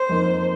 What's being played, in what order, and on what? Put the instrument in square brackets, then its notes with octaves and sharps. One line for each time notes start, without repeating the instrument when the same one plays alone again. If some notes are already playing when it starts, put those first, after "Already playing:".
Already playing: [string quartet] C5
[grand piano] F2 F3 A#3 D#4